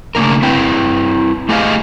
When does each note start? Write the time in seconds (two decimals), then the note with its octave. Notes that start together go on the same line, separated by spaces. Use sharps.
0.15 C#3 A3 A#3 D4 A#4
0.42 C4 E4 B4 G5
1.49 A3 G4 G#4 C5 D#5 F5